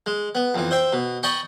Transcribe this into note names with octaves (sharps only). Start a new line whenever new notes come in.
G#3
B3
F2 E3
C5 E5 G5
B2
D#5 G5 A5 B5 C#6